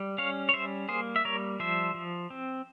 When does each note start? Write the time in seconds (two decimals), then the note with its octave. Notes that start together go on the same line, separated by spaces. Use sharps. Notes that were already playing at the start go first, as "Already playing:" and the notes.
Already playing: G3
0.18 C#4 C#5 F5
0.49 C#5
0.53 G3 C5 E5
0.89 A#3 G#4 C5
1.16 E5
1.25 G3 A#4 C#5
1.60 F3 C5 E5
1.94 F3
2.30 C4